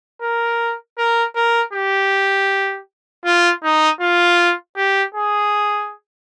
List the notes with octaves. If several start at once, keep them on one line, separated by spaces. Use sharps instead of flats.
A#4
A#4
A#4
G4
F4
D#4
F4
G4
G#4